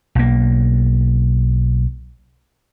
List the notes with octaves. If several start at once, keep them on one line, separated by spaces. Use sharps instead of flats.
B1 A#3